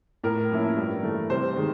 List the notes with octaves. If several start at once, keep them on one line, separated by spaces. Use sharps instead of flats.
A2 A#4
F3 A#3 C#4 E4
G2
E3 A3
C3 C5
D#3 G#3